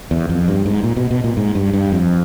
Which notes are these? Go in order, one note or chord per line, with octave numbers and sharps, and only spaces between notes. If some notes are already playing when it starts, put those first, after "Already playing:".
E2
F2
G2
G#2
A#2
B2
B2
A#2
G#2
G2
G2
F2